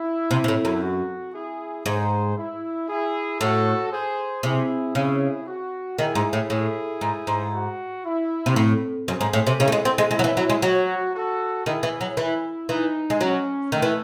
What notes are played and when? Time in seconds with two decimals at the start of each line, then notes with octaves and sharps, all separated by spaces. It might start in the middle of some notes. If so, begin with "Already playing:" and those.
Already playing: E4
0.31 C3
0.44 C3
0.48 A2
0.65 F#2
0.82 F#4
1.34 E4 G#4
1.85 G#2 G#4 C5
2.37 E4
2.88 E4 G#4
3.40 A2 F#4 A4
3.92 G#4 C5
4.43 C3 E4 G#4
4.94 C#3 E4 G#4
5.47 F#4
5.98 D#3 E4 G#4
6.15 G#2
6.33 A2
6.50 A2 E4 G#4
7.01 G#2
7.27 G#2
7.53 F#4
8.05 E4
8.46 C3
8.56 A2
9.08 F#2 G#4 C5
9.21 G#2
9.33 A2
9.47 C3
9.59 C#3 E4 G#4
9.68 A3
9.72 G#3
9.85 C4
9.98 G#3
10.11 G#3 E4
10.19 F#3
10.24 E3
10.37 F#3
10.50 G#3
10.62 F#3 F#4
11.14 F#4 A4
11.66 D#3 E4 G#4
11.83 E3
12.01 F#3
12.17 E3 E4
12.69 E3 D#4
13.10 G#3
13.20 F#3 C#4
13.72 D#3 A3
13.82 E3